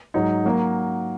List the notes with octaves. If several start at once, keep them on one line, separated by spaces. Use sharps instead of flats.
G#2 F#3 D#4
F#3 A#3 F#4 A#4